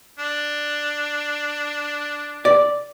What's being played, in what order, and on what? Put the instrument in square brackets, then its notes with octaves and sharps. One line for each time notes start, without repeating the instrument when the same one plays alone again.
[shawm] D4
[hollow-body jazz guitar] D5